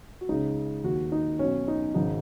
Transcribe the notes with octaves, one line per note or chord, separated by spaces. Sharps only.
F#4
C#2 C#3 D#4
D#2 D#3 F#4
D#4
B1 B2 C#4
D#4
G#1 C#3 D#4